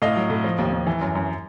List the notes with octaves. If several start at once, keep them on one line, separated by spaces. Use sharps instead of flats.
A2 D#5 F5
F#3
A2
F3
D#2
D#2
E3
F#2
F#2